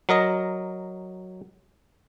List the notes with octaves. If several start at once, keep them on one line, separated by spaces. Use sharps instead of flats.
F#3 A#4 D#5 A#5